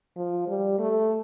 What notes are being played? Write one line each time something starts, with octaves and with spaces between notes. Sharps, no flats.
F3
G3
A3